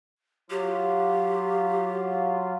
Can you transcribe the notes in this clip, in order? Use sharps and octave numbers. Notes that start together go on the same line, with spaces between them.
F#3 F4 G4